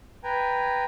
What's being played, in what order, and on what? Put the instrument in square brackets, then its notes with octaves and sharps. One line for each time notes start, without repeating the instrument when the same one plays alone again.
[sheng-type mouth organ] B4 G5 G#5 A#5